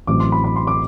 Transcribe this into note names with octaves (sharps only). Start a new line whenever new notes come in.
A1 A2 F#3 C4 E4 D6
C6
B5
B5
C6
D6